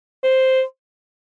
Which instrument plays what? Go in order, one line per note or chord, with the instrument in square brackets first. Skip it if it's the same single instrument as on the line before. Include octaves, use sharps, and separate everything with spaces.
[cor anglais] C5